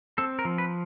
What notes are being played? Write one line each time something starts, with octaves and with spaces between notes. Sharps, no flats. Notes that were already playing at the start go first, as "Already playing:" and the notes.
C4 A4
A#4
F3
B4